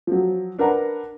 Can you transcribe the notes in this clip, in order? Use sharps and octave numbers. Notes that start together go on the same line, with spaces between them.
F3 F#3
D4 A#4 B4 F#5 A#5